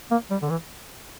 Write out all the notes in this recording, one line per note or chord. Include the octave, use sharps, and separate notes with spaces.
A#3
G3
D3
E3